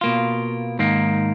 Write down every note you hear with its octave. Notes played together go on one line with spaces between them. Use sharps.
B2 A#3 F4
G#2 D#3 A#3